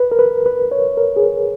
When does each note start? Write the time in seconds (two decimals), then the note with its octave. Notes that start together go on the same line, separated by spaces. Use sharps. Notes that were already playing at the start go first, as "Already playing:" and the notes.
Already playing: B4
0.12 A#4
0.19 B4
0.46 B4
0.71 C#5
0.97 A#4
1.16 G#4
1.24 A#4